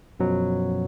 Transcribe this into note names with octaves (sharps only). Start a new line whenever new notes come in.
F#2 B2 F3 F#3